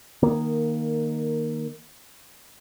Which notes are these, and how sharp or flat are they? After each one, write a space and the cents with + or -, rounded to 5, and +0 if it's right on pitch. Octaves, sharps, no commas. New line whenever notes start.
D#3 -10 A#3 +0